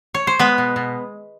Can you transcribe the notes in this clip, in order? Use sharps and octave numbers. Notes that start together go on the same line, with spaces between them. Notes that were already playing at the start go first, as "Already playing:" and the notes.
C#5
C5
G#3 B3 B4
B2
B2